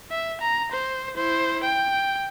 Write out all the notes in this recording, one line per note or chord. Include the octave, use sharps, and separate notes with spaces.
E5
A#5
C5
E4 C5
G5